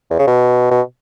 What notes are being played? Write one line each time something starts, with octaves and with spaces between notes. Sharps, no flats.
E2
C#3
B2
B2